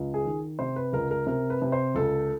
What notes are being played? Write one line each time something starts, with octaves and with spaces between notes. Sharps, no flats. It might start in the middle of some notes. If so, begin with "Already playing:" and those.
Already playing: C#2
G#4
D#3
C3 C5
B4
C#2 A#4
A#4
C3 A#4
B4
C3
C5
C#2 A4